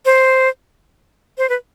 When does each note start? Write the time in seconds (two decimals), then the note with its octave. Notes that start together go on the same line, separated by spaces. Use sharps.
0.06 C5
1.38 C5
1.49 B4